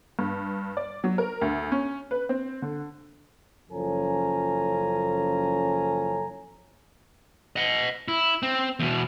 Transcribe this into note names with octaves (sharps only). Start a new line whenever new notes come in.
G2
D5
F#3
A#4
D2
C#4
B4
C4
D3
F#1 F3 C#4 A4 G#5 A#5
D#5 F#5
E4
C4
E2 B2